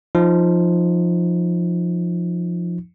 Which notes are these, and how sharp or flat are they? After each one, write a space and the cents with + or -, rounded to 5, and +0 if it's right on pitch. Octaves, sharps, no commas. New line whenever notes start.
F3 +0 D#4 +0